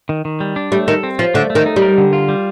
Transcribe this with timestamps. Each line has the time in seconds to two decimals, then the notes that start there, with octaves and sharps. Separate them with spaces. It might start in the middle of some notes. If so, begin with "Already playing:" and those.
0.09 D#3
0.25 D#3
0.40 G3
0.56 D4
0.72 G3 A3
0.88 D#3 A4
1.03 C4
1.19 F3 F4
1.34 D3 A3
1.50 A3
1.55 D#3
1.66 D#4
1.76 G3
1.82 A#4
1.98 D3
2.13 F4
2.29 G3